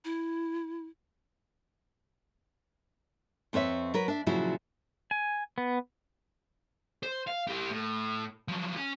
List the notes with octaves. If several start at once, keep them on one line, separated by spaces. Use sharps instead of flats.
E4
F2 C4 B4 C#5 E5
F#3 A#4 B4
D4 E5
A#2 C#3 F3 F#3 E4 F#4
G#5
B3
C5
F5
E4 G4
A2
F3 F#3
C#4 G#5